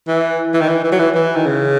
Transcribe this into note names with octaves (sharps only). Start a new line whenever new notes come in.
E3
E3
D#3
E3
E3
F#3
E3
E3
D#3
C#3